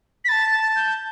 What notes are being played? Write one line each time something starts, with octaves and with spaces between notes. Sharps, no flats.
B6
A5 B5 A6
A6
G6